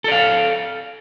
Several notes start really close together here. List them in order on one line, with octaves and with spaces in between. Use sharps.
A4 D5 F5